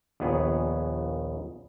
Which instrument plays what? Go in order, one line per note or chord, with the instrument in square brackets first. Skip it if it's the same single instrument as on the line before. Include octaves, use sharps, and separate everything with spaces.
[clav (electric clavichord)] A#1 D#2 B3 G#4 C#5